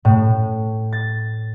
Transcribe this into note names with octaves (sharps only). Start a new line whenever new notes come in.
A2
A6